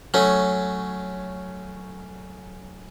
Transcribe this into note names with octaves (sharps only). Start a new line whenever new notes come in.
F#3 A3 C#4